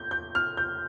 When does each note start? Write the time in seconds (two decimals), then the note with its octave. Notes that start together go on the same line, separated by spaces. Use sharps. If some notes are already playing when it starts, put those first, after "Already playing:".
Already playing: G6
0.11 G6
0.35 F6
0.57 G6